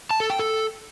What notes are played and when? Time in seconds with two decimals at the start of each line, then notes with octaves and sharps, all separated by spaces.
0.11 A5
0.20 A4
0.30 G5
0.39 A4